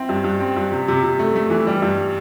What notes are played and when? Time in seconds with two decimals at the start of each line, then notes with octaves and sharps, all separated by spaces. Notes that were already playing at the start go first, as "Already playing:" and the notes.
Already playing: C4 E4
0.09 G2
0.24 G2
0.40 C4
0.56 G2
0.72 C3
0.88 C3
1.03 C3
1.19 A3
1.36 A3
1.50 E3
1.67 G3
1.82 G2